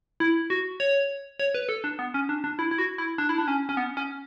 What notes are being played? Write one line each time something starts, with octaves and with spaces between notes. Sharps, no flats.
E4
F#4
C#5
C#5
B4
A4
D4
B3
C#4
D4
D4
E4
E4
F#4
E4
D4
E4
D4
C#4
C#4
B3
C#4